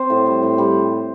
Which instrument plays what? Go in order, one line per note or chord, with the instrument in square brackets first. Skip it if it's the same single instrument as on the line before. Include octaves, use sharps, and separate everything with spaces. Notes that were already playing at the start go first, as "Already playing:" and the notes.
Already playing: [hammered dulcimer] C4 C5
A2
G3
A2
G3